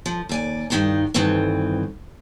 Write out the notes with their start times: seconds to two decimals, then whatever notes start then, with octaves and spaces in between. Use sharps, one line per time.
0.06 F3
0.29 D#2 D5 G#5
0.70 G2 A#2 D#3 D4 D#4
1.14 D2 G2 D#3 E3 C4